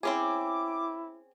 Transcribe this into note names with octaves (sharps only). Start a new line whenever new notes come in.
C4 C#4 E4 G#4 D6